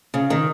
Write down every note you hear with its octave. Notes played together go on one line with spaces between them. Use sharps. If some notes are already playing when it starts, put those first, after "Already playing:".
C#3
D#3